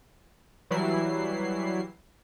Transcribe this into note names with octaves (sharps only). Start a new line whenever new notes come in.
E3 F#3 G3 E4 C7